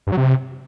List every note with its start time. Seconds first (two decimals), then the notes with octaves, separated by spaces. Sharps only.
0.07 G2
0.12 F#3
0.17 C3